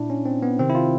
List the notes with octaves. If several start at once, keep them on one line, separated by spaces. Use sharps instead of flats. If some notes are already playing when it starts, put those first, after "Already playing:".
Already playing: A#2 D4 E4
C#4
C4
B3
C3 D#3 C4
E4
F4